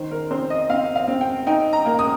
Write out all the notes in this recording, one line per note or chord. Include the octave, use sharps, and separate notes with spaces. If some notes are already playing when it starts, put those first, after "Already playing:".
Already playing: D#3 C5
A#4
C4 C5
D#5
C4 F5
F5
C4
G5
D#4 G5
A#5
A#3
D#6